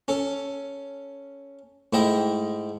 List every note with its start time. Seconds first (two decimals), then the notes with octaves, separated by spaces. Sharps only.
0.08 C#4 A4
1.93 G#2 A3 E4 D#5 G5